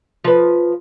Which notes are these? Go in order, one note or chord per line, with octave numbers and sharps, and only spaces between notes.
F3 B4